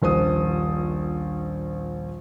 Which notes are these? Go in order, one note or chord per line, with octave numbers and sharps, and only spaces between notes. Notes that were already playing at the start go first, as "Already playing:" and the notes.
D#1 A#1 C5 D#6